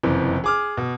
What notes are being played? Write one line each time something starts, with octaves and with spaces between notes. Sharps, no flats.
F#1 F2 C3 E3
G#4 D6 F6
B2